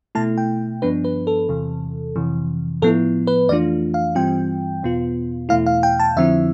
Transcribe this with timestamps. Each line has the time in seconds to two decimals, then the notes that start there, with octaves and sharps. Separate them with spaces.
0.15 B2 A3 E4 A5
0.38 G5
0.82 G2 F3 B3 D4 B4
1.04 B4
1.27 A4
1.49 E2 C3 E3
2.16 F2 C3 E3
2.82 A2 F3 B3 E4 A4
3.27 B4
3.49 F2 E3 A3 D4 F4 D5
3.94 F5
4.15 G2 E3 G3 C4 F4 G5
4.83 E2 B2 B3 F4
5.49 E2 B2 A3 E4 F5
5.66 F5
5.83 G5
6.00 A5
6.17 F2 D3 F3 C4 E4 E5